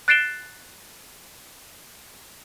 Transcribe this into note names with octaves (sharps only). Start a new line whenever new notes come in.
F#6 A6 C7 D7 E7 G7